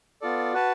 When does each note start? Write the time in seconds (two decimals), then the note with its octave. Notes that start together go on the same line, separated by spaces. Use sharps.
0.21 B3 F4 A4 D5
0.53 F#4 B4 F#5 A5